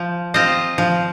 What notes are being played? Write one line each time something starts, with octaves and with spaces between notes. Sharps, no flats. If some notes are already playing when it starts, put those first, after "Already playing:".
Already playing: F3
C4 F4 C5 D#5
F3